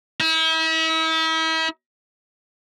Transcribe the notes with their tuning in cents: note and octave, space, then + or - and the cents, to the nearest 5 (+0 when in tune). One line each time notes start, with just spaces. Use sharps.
E4 -40